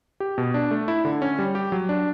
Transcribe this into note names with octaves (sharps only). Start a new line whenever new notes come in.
G4
B2
D4
A3
E4
D3
C#4
G3
G4
F#3
D4